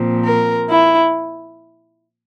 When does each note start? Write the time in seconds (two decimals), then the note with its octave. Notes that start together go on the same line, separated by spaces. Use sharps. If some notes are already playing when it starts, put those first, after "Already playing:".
Already playing: A#2 F3 C4
0.24 A#4
0.68 E4